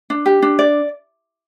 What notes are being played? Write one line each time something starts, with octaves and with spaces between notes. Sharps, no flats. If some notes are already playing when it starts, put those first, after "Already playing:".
D4
G4
D4
D5